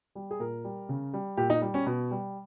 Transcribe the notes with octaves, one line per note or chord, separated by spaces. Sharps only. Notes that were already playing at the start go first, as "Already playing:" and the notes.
G3
G#4
A#2 A#4
G3
C#3
G3
A#2 G4
D#4
G3
C#4
B2
G3